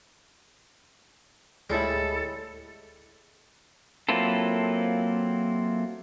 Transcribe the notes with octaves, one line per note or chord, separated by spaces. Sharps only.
D2 A2 G3 G#3 E4 A4
F#3 A#3 C4 E4 F4 A4